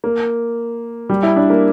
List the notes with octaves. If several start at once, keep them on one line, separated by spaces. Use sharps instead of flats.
A#3
G3
E4
D4
A#3